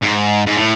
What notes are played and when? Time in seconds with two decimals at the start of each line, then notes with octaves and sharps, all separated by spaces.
0.03 G#2
0.46 G#2
0.57 A2